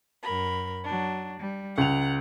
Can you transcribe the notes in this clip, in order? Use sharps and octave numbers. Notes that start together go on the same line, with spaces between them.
F#2 A#4 B5
F#3 D4
G3
C#2 F#5 F7